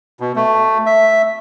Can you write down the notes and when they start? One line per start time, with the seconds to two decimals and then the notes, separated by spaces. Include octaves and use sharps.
0.20 B2
0.36 A3
0.86 E5